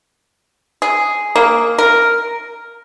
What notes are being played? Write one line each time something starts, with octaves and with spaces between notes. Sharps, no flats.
G#4
A#3
A#4